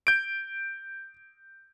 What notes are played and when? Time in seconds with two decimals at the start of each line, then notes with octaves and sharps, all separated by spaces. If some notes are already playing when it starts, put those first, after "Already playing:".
0.07 G6 D7